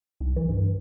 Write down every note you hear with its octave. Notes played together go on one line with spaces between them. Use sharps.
C2
E3
G2